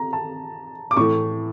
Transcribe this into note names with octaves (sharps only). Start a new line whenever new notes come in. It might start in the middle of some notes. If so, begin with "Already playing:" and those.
Already playing: A#5
A5
D6
A2 E3 A3 C#6